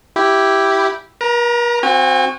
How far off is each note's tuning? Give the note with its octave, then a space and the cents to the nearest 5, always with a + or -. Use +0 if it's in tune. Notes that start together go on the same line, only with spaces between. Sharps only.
E4 +0 G4 -5
A#4 +45 A#5 +0
C4 +0 F#4 -15 G#5 -45